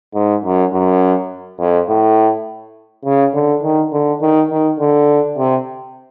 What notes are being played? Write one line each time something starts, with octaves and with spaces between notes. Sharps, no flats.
G#2
F#2
F#2
F2
A2
C#3
D3
D#3
D3
D#3
D#3
D3
C3